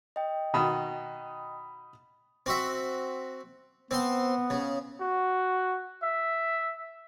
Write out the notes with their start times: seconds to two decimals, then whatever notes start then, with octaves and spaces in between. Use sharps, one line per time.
0.16 D#5 G5
0.54 B2 D#3 B5 D#6
2.46 C4 F#4 E5
3.91 B3 C4 C5 C6
4.50 C#3
5.00 F#4
6.03 E5